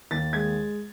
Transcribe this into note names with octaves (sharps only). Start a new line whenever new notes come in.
D#2 A6
G#3 G#6